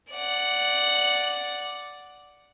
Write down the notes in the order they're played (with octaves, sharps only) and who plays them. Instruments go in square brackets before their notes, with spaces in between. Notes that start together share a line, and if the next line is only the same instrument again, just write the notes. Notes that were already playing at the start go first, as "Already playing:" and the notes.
[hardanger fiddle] D5 F#5